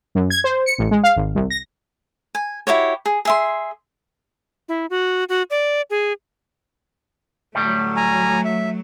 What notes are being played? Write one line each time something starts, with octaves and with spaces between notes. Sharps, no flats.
F#2
G#6
C5
C#7
A1
G#3
F5
G#1
C2
A#6
G#5
E4 F#4 G4 C#5
G#4
G#4 E5 C6
E4
F#4
F#4
D5
G#4
D2 A2 F#3 G3 A3
G#5 A#5
E5